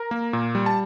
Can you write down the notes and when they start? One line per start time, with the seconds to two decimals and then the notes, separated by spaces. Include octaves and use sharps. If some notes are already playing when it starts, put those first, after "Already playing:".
Already playing: A#4 A#5
0.11 A#3
0.33 A#2
0.55 G3
0.66 A5